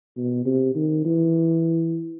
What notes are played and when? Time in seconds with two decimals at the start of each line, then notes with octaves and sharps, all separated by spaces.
0.17 B2
0.46 C3
0.75 D#3
1.05 E3